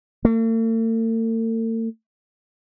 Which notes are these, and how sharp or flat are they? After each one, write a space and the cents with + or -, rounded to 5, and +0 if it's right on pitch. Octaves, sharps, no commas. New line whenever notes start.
A3 +45